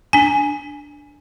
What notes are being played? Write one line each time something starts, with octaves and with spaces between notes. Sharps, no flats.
D4 G#5